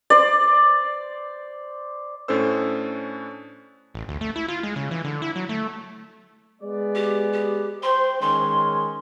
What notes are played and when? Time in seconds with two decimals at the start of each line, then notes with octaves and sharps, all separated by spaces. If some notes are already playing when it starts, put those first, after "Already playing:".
0.10 C5 D5
2.28 A2 C#4 D4 A4 C5 E6
3.94 A1
4.09 D2
4.21 A3
4.36 E4
4.48 F4
4.63 G#3
4.76 C#3
4.91 E3
5.04 D3
5.22 E4
5.36 F#3
5.49 A3
6.62 G#3 B3 D5
6.95 G4
7.33 G4
7.82 C5 G5 C6
8.21 D#3 G#3 C#4 C6